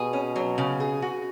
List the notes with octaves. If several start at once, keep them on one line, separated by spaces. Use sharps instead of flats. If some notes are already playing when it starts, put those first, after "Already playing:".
Already playing: B2 G#4
C#4
F#3
C#3
G#4
F#4